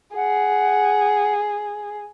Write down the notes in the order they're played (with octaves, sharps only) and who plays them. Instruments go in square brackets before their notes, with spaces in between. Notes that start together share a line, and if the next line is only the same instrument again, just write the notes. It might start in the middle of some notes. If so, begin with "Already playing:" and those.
[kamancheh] G#4 [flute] F#5